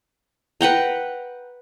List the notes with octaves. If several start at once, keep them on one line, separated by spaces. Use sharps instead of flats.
B4 F#5 G5 A#5